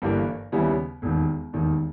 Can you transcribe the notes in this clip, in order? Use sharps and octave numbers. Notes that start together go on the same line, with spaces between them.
G1 G2 E3 A#3
D#2 C#3 G3 B3 E4
E1 D#2 D#3
E1 D#2 D#3